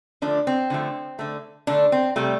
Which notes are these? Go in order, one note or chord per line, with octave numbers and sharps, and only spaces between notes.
D3 F3 A3 D4
C4
D3 F3 A3
D3 A3
D3 A3 D4
C4
C3 G3 A3